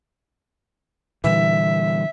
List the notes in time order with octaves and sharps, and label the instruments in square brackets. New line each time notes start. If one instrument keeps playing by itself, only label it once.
[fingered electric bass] A#2 D3 G3 [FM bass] E3 [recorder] E5